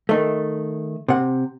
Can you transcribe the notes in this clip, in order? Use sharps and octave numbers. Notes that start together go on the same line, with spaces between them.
D#3 A3
C3 F#5